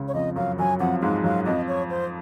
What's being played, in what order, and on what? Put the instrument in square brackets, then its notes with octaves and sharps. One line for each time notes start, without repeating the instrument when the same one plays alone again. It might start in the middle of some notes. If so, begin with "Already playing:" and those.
Already playing: [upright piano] C#2 C#3
[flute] C#5
[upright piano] F2 F3 [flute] D#5
[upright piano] F#2 F#3 [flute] F5
[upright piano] F#2 F#3 [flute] G#5
[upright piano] F2 F3 [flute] F#5
[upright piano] G#2 G#3 [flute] F5
[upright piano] F#2 F#3 [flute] F5
[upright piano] F2 F3 [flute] D#5
[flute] C#5
C5